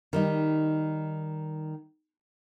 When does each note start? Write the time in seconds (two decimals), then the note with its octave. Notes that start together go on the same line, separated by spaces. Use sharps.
0.13 D#3 G3 D#4